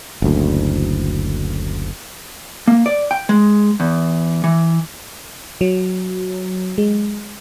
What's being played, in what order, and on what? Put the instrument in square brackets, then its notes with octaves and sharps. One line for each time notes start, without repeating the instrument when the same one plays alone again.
[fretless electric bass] F#1 D2
[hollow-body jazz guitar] A#3
D5
G5
G#3
E2
E3
[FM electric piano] F#3
G#3